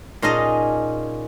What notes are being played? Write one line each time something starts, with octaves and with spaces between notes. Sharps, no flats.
A#2 C#4 D#4 G#4 D#5 A5